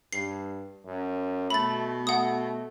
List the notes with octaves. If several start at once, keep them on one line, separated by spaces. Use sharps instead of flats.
G2 C7
F#2
B2 A3 B5 A6
A3 F#5 D#6